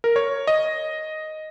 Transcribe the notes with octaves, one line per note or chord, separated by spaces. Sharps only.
A#4
C#5
D#5